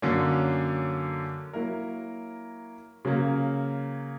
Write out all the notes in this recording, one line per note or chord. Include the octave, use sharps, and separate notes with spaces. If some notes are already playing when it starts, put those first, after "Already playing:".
F#2 D3 A#3 C#4
F#3 A#3 E4 A#4
C#3 F#3 A#3